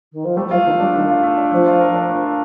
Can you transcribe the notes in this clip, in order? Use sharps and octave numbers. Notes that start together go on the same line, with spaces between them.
D#3
F3
G3 A3
F3 F4
D#3 A3
G3 D4
D#3 A3
F4
A3
D4
F3 A3
F4
A#4
D4
A3
F4